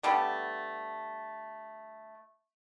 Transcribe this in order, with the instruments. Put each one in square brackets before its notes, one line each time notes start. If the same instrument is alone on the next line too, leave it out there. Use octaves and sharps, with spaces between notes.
[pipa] D3 G3 A3 B3